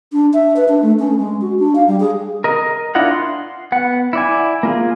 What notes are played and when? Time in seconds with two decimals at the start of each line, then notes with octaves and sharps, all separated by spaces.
0.12 D4
0.33 E5
0.56 B4
0.68 D4
0.82 A3
0.99 C#4
1.19 G#3
1.41 F#4
1.59 D4
1.75 F5
1.88 G3
2.00 G#4
2.44 A#4 D#5
2.95 D4 E4 F4 D#5 F#5
3.11 C6
3.72 B3 F#5
4.13 E4 D5 G#5
4.63 A#3 F4 G#4